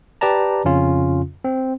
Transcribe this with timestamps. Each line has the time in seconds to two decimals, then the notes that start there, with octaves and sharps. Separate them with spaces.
0.21 G4 B4 D5 A5 A#5
0.65 F2 C#3 C#4 F4
1.44 C4